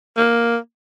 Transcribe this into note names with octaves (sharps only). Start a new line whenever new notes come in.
A#3